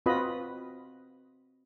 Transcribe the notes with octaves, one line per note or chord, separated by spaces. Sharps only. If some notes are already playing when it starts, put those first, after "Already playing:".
C4 F4 F#4 B4 D#5 B5